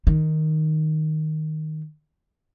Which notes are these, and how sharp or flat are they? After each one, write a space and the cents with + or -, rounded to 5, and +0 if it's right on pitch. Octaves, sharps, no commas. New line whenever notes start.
D#3 +0 D#4 +0